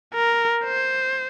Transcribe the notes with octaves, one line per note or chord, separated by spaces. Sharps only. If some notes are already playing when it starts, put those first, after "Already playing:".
A#4
C5